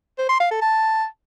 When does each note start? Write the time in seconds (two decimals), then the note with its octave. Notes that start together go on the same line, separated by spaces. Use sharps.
0.18 C5
0.29 C6
0.40 F5
0.51 A4
0.61 A5